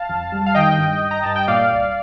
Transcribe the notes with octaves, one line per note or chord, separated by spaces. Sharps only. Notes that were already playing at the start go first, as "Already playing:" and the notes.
Already playing: F5 A5
F2
G3
F5
D#3 D#5 G5
G2
G2
A#5
G2 A5
G5
A#2 D5 F5
C2